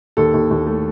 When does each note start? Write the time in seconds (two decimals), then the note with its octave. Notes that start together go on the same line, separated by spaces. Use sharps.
0.17 D#2 A4
0.34 D#2
0.51 D#2
0.67 A3